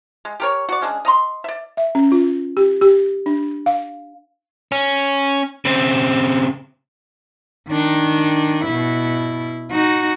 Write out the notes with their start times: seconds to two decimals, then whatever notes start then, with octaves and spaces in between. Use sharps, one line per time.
0.25 G#3
0.40 G4 A#4 C#5
0.69 F#4 D5
0.81 C#3 G#3 D4 G#4
1.05 D#5 A#5 C6
1.44 D5 E5
1.77 E5
1.95 C#4
2.12 F4
2.57 G4
2.81 G4
3.26 D4
3.66 F5
4.72 C#4
5.65 C#3 C4
7.69 D#3 D4
8.65 B2 E4
9.72 D#4 F#4